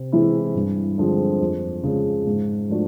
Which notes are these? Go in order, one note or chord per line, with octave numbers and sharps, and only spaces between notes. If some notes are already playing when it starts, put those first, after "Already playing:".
Already playing: C3
E3 G#3 C4 E4
G2
D3 F3 G#3 C4
F2
C#3 F3 G#3
G#2
F3 A3 D4 F#4